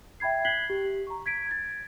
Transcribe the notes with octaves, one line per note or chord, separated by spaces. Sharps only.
E5 G5 B5 G#6 C7
F#6 G#6 B6 C7 F#7 G7
G4
A#5 C#6
G#6 B6 D7
G#6 A6